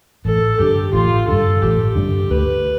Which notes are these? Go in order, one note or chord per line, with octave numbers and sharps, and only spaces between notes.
A1 A4
G2 D3 G4
A1 F4
G2 D3 A4
A1 G4
G2 D3
D2 B4